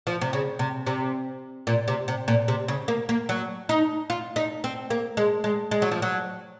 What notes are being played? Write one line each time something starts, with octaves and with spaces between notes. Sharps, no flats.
F3
C3
C#3
C3
C3
A#2
C3
C3
A#2
C3
C#3
A#3
A#3
F#3
D#4
F4
D#4
C4
A#3
G#3
G#3
G#3
F#3
F3
F#3